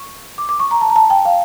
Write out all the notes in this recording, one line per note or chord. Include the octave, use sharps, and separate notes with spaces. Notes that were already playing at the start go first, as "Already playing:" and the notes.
Already playing: C#6
D6
D6
C#6
A#5
A5
A#5
A5
G5
F5